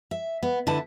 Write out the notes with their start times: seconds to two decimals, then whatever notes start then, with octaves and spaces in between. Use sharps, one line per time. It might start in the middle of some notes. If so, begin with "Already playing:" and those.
0.11 E5
0.43 B3
0.67 D3 E4 B4 A5